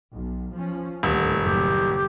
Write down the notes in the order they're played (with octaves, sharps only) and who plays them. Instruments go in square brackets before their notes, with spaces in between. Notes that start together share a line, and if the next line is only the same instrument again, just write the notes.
[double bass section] B1
F3 C#4
[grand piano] D#1 [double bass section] D2 A2 A3
[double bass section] F#1 A2 [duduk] G4